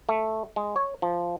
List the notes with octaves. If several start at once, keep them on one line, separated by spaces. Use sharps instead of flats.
A3
G#3
C#5
F3